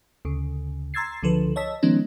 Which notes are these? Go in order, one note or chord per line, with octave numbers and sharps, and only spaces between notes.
D2 C#3
A#5 C6 E6 G#6 A6 C7
C#2 D3 F3 A4 B4
C#5 D#5 A5 E6 B6
D#3 F3 G#3 B3 C#4 D#4